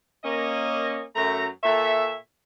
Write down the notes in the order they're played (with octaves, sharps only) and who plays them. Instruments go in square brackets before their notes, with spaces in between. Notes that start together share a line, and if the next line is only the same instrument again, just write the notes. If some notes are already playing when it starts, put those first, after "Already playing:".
[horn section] A#3 C#4 D#5
F#2 A3 A#5
A#2 A4 C#5 E5